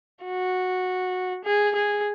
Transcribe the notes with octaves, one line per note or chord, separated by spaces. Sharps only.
F#4
G#4
G#4